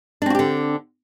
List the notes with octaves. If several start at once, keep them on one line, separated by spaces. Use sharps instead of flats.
D3 C4 D4 F#4 G4